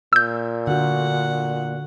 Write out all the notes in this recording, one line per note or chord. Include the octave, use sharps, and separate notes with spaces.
A#2 E6 G6
D3 F#4 F#5